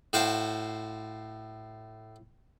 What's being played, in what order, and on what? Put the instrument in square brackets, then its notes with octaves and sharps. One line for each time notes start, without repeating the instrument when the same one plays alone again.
[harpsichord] A2 F#4 C5 F5 G5 A5